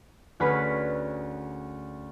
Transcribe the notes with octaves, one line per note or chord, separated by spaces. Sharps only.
D2 C#4 G#4 B4 B5 B6